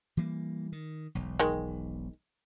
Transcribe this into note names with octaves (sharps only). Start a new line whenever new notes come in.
E3 G3 A#3
D#3
E1 B1
D#3 G#3